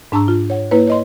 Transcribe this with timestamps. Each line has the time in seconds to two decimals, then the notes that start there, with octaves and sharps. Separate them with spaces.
0.12 G#2 D4 A5 A#5 C#6 E6
0.28 F4
0.50 C#5 F#5
0.71 A#3 E4 B4 C#5
0.87 C#5 D#5 C6